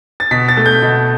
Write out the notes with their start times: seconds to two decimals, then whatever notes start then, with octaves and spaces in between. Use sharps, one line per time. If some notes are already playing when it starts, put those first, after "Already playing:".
0.20 A6
0.31 B2 B6
0.48 A6
0.57 A3
0.66 G6
0.82 B2